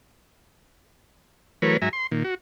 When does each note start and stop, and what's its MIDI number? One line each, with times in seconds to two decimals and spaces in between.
1.62 1.77 52
1.62 1.77 54
1.62 1.77 57
1.62 1.77 70
1.62 1.77 71
1.62 1.77 73
1.82 1.89 44
1.82 1.89 54
1.82 1.89 76
1.82 1.89 80
1.82 1.89 82
1.93 2.07 84
2.11 2.23 46
2.11 2.23 51
2.24 2.35 66